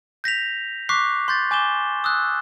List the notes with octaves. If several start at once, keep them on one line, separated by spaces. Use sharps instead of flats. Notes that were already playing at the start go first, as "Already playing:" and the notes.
G6 A#6 B6 F7
C#6 D6 F#6 B6 C7
C6 G6 A6
G#5 D6 G6 E7 G7
D#6 E6 F#6